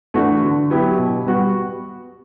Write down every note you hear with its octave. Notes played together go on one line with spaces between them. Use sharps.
E3 A3 D4 F#4
D3
F#3 B3 E4 G4
B2
G3 B3 F#4